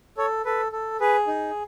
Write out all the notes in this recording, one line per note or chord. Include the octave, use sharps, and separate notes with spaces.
A4 C#5
A4 B4
A4
G#4 B4
D#4